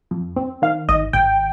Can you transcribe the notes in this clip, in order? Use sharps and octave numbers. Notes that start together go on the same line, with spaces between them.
F2
C4
D#3 F5
G#1 D#5
G#1 G5